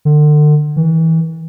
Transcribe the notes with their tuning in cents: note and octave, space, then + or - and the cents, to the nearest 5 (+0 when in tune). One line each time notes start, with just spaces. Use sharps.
D3 +35
E3 -30